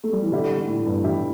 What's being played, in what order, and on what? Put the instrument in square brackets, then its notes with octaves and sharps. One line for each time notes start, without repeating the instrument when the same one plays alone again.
[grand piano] A3
G3
E3
[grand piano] D3 [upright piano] G3 E4 G4
[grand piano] D3
A2
G2
[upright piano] G3 E4 G4